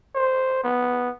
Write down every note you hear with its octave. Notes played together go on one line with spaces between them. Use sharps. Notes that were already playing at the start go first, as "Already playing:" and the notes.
C5
B3